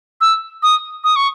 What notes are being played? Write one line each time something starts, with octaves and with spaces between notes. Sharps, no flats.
E6
D#6
D#6
C#6